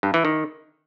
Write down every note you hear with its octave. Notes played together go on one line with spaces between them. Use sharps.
G2
E3
D#3